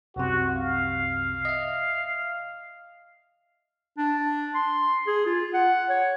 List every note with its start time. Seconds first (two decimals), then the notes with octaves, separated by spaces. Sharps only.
0.16 C2 F#2 C3 F#4
0.56 F5
1.45 D#5 E5
3.98 D4
4.55 C6
5.07 G#4
5.26 F4
5.54 F#5
5.89 C#5